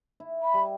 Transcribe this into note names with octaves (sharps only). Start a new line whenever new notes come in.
E4
B5
G3